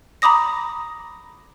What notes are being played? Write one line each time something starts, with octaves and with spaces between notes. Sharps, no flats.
A#5 B5 D6 D#6 A#6